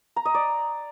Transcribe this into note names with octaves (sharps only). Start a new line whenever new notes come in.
A#5
D#5
D5